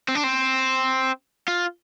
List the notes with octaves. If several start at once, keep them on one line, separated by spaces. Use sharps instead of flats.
C4
D4
C4
F4